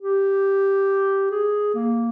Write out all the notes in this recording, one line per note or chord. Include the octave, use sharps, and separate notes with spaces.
G4
G#4
A#3